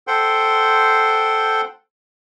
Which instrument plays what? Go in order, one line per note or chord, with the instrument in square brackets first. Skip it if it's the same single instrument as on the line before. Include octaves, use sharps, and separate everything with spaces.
[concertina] A4 C5 F#5 G5 C6